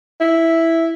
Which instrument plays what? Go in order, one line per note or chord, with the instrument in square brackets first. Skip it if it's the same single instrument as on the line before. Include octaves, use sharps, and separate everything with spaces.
[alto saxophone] E4